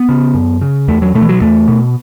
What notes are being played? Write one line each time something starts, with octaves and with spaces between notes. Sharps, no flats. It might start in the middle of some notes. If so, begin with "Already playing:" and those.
Already playing: B3
C#3
F#2
C#3
E2 A3
F#3
B2 A3
E3
F#3
E2 A3
B2